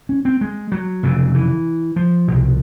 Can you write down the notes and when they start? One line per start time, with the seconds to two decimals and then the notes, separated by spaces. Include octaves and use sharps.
0.09 C#4
0.25 C4
0.41 G#3
0.72 F#3
1.03 F1 F2 C#3
1.34 E3
1.96 F3
2.28 C2 B2